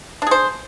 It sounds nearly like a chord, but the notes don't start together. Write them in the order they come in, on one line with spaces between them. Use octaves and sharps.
D4 G#4 C5